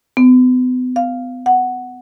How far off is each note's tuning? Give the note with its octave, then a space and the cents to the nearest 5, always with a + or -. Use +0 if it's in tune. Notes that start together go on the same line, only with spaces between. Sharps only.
B3 +40
F5 +0
F#5 +5